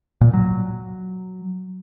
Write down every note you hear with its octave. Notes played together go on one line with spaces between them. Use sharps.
A#2
F#3